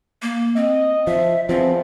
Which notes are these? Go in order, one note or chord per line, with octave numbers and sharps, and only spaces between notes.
A#3
C4 D#5
F3 E5
E2 F3 C4